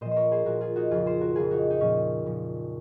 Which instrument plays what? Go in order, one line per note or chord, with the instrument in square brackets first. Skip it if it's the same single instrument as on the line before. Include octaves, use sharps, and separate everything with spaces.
[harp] A#2 F3 C5 D#5
C5
A#4 C#5
G#4 C5
A#2 F3 F#4 A#4
F4 G#4
D#4 F#4
F2 C#3 F3 F4 G#4
G#4 C5
F#4 A#4
F2 C#3 F3 F4 G#4
D#4 F#4
D#4
A#2 F3 C#4
A#2 F3